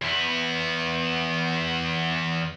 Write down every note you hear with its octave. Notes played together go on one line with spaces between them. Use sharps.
E2 B3